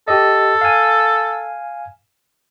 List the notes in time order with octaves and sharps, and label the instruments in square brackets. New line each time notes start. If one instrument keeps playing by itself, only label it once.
[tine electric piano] G4 D#5 [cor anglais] A4
[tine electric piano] F5 G#5